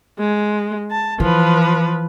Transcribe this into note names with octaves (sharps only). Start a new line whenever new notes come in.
G#3
A5
E3 F3 B4